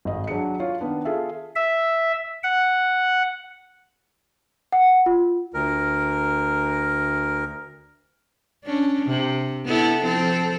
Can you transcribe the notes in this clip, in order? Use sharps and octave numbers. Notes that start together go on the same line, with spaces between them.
G#1 D#5
F#3 D4 G#4 C#7
F4 C#5
D#3 B3 D4
F4 G#4 A4 E5
E5
F#5
F#5
F4
D2 A#4
C#4 D4
C3
B3 E4 A4
F3 C4 A4